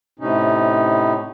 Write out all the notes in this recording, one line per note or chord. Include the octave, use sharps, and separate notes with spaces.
A2 C3 C#4 D#4